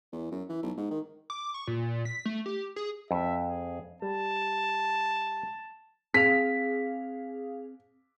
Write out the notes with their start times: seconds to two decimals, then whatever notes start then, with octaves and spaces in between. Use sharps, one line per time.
0.12 E2
0.31 F#2
0.49 E3
0.63 B1
0.77 G#2
0.91 D#3
1.30 D6
1.54 C#6
1.68 A#2
2.05 B6
2.26 A3
2.46 G4
2.76 G#4
3.11 F2 E5
3.46 G#4
4.02 G3 A5
6.14 C4 G#4 F5 B6